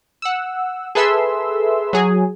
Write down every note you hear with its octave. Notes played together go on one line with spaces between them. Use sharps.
F#5 E6
G#4 A4 B4 E5 C6 E6
F#3 G#4